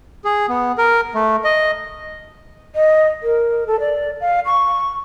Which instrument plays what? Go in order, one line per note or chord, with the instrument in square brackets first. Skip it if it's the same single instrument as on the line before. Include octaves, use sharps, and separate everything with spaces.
[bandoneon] G#4
B3
A#4
A3
D#5
[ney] D#5
A#4
A4
D5
F5
C#6